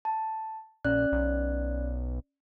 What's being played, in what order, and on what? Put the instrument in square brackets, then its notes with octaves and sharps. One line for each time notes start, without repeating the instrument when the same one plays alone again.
[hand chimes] A5
[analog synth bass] A#1 [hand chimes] C#4 D5 F#6
[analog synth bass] B1